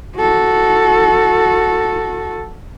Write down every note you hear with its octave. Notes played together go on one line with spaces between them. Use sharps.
F#4 A4